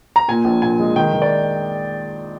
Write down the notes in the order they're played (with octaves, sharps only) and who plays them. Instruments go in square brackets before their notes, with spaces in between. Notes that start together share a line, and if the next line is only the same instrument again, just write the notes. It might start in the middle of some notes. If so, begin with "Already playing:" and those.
[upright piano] A#5
A#2 G#5
A#1
A#2 G#5
G#3
D#3 G5
D#3
D5